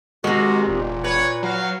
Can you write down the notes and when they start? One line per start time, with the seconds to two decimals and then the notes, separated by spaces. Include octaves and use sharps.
0.24 C3 D#3 G#3 F#4
0.67 E1 A#2
1.04 B4 C#5 F#5
1.43 F#3 F#4 F5